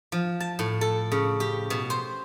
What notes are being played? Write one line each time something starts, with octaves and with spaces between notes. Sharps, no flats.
F3
A5
A2
A4
C#3
G4
B2
C5